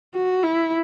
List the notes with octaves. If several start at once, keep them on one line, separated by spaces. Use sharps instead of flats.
F#4
E4